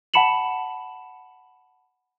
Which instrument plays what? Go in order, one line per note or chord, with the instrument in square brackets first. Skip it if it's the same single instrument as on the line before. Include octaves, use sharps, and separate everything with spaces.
[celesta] F#5 A5 B5 C#7 E7 F#7